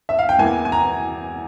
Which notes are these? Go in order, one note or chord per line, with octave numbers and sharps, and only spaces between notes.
E5
F5
G5
E2 E3 A#3 G#5
G#5
A#5